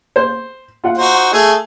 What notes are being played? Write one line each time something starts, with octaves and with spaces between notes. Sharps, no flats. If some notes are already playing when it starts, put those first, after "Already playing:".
C5
F4 F#5
D#4 F#4 C5
A3 G#4